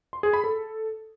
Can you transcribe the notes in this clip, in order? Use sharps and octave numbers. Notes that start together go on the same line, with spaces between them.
C6
G#4
B5
A4